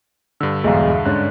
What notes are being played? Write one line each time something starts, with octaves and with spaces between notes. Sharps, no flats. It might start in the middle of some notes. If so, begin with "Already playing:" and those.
G2 D3 E6
B1 E2 G#2 G#4 E5 F5
G#2 C#4 D4 F#6